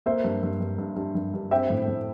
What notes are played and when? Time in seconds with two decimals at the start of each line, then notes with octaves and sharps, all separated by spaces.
0.06 A#3 C5 E5
0.24 G2
0.43 G2
0.60 G2
0.78 G2
0.96 G2
1.15 G2
1.34 G2
1.51 C4 E5 G5
1.70 A2
1.88 A2